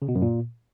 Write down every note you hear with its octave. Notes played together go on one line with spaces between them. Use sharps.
C#3
B2
F#2
A#2